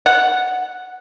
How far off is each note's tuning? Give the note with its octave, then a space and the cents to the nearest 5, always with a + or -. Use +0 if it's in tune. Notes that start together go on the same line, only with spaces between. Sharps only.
F#5 -5